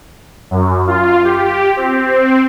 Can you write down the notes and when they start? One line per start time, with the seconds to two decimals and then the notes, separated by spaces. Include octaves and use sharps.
0.51 F#2
0.87 F4
1.24 G4
1.77 C4